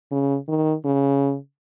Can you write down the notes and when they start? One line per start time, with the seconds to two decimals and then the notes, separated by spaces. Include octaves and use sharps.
0.11 C#3
0.48 D#3
0.85 C#3